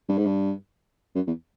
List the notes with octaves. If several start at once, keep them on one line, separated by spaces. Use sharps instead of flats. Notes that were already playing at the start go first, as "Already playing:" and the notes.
G2
G#2
G2
F#2
E2